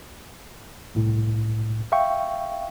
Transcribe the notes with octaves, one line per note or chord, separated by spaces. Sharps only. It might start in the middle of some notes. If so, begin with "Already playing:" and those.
C2 A2
E5 F5 G5 C#6